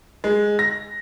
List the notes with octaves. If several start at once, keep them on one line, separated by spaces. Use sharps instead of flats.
G#3
A#6